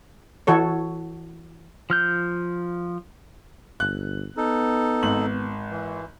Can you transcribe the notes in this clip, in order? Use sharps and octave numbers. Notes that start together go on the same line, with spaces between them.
E3 F#4 A4 C#5
F3 F6 G6
G1 F#6
B3 D#4 A4
G#1 F#7
E3